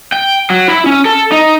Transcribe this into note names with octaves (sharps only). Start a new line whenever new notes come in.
G5
F#3
E4
C#4
A4
D#4